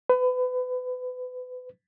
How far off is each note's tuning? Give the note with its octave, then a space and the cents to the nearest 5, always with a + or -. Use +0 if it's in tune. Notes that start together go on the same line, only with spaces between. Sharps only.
B4 +30